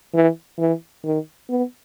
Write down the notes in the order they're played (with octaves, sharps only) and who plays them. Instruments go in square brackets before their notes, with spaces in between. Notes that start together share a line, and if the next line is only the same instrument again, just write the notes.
[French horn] E3
E3
D#3
B3